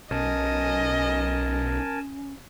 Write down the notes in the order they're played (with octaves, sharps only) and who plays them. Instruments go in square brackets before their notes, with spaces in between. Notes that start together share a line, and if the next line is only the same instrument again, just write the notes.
[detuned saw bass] B1 [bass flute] C#4 [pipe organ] A#4 G#5 A5 [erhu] D#5